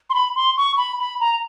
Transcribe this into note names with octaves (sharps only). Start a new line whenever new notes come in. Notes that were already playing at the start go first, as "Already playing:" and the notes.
C6
B5
C6
C#6
B5
B5
A#5